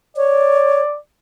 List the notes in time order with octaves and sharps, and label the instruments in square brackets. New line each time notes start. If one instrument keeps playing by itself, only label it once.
[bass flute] C#5 [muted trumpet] D5